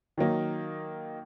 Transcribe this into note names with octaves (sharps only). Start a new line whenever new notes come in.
D#3 F#3 A#3 D#4